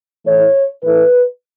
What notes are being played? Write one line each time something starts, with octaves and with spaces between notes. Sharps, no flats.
A2 E3 A3 C#5
A2 E3 A3 B4